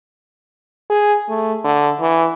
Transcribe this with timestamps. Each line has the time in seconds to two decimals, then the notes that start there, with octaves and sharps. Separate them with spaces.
0.90 G#4
1.29 A3
1.64 D3
2.00 E3